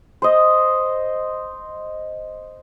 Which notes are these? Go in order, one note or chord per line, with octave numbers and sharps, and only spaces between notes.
C5 D#5